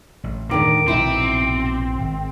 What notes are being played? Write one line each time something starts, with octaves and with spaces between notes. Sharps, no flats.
A1
D#2 A2 D3 D#3 G#3 D6
A#1 G#2 B2 E3 C4 D#4 E4
G#1